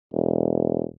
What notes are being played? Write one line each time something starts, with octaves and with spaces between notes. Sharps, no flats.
E1